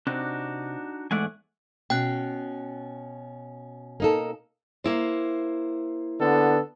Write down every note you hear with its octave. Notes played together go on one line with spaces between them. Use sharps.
C3 D4 D#4 F#4
E2 G#2 A3 D5 F#5 G#5
B2 C#4 G5 F#6
A#3 D#4 A4
A#3 E4 C5
D3 B3 A4